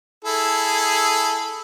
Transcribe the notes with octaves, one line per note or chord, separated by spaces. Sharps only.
E4 G#4 A4